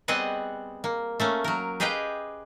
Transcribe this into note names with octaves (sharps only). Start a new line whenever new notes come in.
G3 B3 C4 G#4 D#5 F#5
A#3
A3 A#3 C#4
F#3 A#4
G4 G#4 B4 D#5 F5 G5